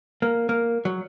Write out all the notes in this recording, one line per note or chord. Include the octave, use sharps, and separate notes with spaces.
A#3
A#3
F#3